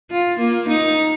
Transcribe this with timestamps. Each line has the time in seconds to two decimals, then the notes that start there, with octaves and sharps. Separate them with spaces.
0.11 F4
0.39 A#3
0.68 D#4